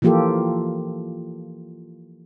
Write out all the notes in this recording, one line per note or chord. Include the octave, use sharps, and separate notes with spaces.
E3 F3 A#3 F4 G4 A4